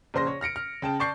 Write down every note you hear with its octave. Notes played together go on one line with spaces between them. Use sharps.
A#1 C#3 C5 C6 A#6
C#5
F6 A#6 C#7 D7
F6
C#3 G5 A5
D5 A5 C#6 G6 C7